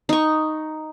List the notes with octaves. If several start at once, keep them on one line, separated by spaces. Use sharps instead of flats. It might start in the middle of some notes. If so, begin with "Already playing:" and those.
D#4 C#6